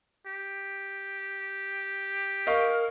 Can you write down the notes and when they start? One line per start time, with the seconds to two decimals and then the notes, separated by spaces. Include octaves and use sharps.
0.26 G4
2.47 A#4 D#5 F5 C#6